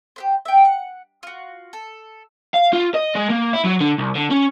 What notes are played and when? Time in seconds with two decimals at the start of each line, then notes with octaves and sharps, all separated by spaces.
0.16 G4 B4 C5
0.45 E5 G5
0.65 F#5
1.23 F4 F#4
1.73 A4
2.54 F5
2.73 F4
2.94 D#5
3.15 G#3
3.30 A#3
3.53 E4
3.65 F#3
3.81 D3
3.98 C2
4.15 D3
4.31 C#4